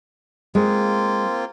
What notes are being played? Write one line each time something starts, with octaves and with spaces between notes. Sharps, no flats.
G#3 A#3 C4 F4